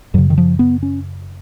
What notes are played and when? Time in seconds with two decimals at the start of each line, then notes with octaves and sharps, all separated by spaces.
0.14 F#2 C#3 F#3
0.30 D#3
0.38 F3
0.59 B3
0.83 C#4